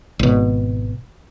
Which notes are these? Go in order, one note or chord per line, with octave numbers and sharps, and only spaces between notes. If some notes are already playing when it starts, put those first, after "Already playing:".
G#1 B2